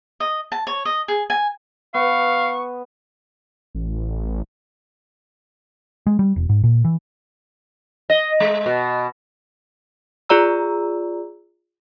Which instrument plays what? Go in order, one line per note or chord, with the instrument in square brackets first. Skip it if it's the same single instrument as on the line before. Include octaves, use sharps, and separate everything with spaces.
[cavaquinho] D#5
A5
C#5
D#5
G#4
G#5
[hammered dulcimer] B3 [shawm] F5 [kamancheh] C#6
[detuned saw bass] A1
[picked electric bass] G#3
G3
E1
G#2
A#2
E3
[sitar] D#5
G#3
B2
[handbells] F4 G#4 D5 A#5 E6